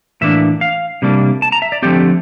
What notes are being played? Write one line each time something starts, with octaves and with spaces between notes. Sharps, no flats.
A2 E3 A#3 D4 E5
F5
C3 G3 A#3 D4
A5
A#5
E5
D5
D3 F3 A3 C4 G4